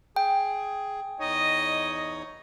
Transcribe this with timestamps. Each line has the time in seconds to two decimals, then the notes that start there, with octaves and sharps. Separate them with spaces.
0.16 G#4 G5
1.19 E2 D#4 C#5 D#5